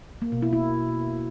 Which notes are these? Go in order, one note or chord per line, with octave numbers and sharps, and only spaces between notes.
A#3
B2
E4
E4